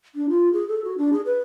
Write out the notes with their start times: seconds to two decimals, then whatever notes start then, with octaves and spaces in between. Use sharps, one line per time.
0.15 D4
0.29 F4
0.53 G#4
0.68 A4
0.84 F#4
0.98 D4
1.13 G#4
1.26 B4